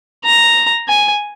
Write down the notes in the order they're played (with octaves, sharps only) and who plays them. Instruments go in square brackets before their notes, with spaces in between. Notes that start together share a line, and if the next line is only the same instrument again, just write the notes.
[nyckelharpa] A#5
G#5